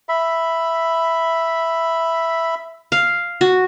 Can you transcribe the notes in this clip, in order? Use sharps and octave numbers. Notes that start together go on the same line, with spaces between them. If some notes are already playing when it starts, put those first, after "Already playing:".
E5 B5
F5
F#4